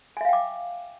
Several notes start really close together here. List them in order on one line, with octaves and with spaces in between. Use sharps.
G#5 E5 F5 G5 D6